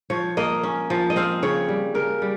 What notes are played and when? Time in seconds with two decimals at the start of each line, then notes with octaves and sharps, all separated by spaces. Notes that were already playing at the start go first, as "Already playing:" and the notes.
0.10 F3 C#5
0.37 A#3 D#5
0.63 C#4
0.90 F3
1.10 D#5
1.16 C4 F5
1.42 C#3 C#5
1.69 G3
1.95 C#3 A#4
2.22 G3